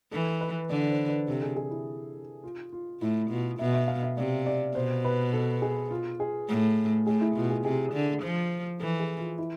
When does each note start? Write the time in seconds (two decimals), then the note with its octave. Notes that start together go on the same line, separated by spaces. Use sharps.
0.12 E3 A4
0.41 B4
0.70 D3 D5
0.89 C5
1.08 B4
1.27 C3 A4
1.42 G#4
1.56 G#4
1.71 E4
2.44 F4
2.73 F4
3.01 A2 E4
3.30 B2 F4
3.59 B2 E5
3.74 E5
3.88 F5
4.03 E5
4.17 C3 D5
4.46 D5
4.75 B2 C5
5.05 B4
5.33 A4
5.62 G#4
5.91 F4
6.20 G#4
6.48 A2
7.07 A2 G#4
7.21 E4
7.36 B2 F4
7.50 G#4
7.64 C3 G#4
7.93 D3
8.22 F3 C5
8.80 E3 A4
9.00 G#4
9.19 F4
9.38 E4